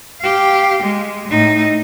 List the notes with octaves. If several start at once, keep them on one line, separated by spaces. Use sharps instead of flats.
G4 F5
G#3
A2 D#4